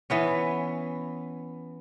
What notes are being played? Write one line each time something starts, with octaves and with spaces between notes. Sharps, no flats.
E3 B3 C#4